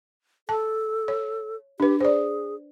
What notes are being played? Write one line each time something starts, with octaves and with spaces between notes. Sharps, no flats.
A4 A5
C#5
D4 G4 B4
G#4 C5 D5